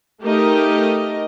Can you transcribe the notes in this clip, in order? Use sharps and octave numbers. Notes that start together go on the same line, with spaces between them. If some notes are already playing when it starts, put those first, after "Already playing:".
A3 D#4 G4 A#4 D#5